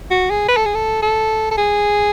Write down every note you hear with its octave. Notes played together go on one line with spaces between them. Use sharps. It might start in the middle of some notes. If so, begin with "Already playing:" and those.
F#4
G#4
B4
A4
G#4
A4
A4
A4
G#4